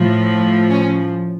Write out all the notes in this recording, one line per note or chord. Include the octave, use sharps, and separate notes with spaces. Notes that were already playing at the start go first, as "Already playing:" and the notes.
Already playing: A2 F3
C#4